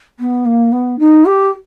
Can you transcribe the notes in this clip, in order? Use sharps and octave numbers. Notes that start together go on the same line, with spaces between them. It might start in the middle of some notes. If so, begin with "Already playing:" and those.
B3
A#3
B3
D#4
G4